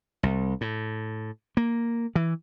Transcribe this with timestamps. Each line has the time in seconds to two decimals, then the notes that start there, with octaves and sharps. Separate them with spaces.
0.23 C2
0.61 A2
1.57 A#3
2.15 E3